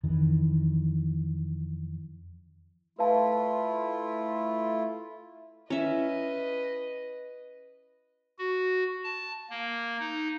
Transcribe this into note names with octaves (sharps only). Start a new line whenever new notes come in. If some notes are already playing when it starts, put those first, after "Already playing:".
F2 D#3 E3
A3 E4 F4 B4 F5 A5
C#4 E4 B4 D#5 E5
F#4
A5
A#3
D#4